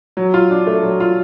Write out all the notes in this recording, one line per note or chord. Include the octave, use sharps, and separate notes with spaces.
F#3
F4
D4
A3
F#3
F4